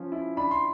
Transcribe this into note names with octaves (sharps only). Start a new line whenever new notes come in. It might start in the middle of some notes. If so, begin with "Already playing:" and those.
Already playing: F3 C#4
E4
D4 B5
C6